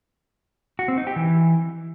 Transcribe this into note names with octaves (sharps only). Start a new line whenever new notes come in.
F#4
C4
D#4
G4
E3